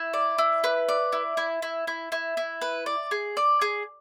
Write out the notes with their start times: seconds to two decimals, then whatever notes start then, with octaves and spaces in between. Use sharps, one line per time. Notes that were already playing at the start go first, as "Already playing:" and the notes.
Already playing: E4
0.13 D5
0.38 E4
0.64 B4
0.89 D5
1.13 E4
1.37 E4
1.62 E4
1.87 E4
2.12 E4
2.37 E4
2.61 B4
2.86 D5
3.11 G#4
3.37 D5
3.61 G#4